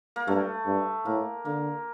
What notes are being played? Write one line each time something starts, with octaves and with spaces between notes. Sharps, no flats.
A#3
G2 A3
G2
A2 A#3
D3 A#3